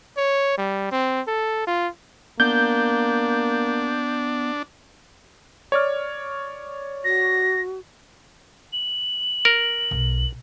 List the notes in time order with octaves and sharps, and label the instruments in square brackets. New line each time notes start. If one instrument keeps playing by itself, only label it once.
[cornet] C#5
G3
C4
A4
F4
[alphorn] A#3 [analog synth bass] B3 [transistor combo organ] D4 [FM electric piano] G6
[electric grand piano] C#5 D5 F6
[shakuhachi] F#4 [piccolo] A#6
[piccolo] F#7
[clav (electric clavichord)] A#4
[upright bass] B1